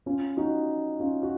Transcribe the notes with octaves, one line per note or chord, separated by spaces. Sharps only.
C#4 F4
D#4 F#4
C#4 F4
F#4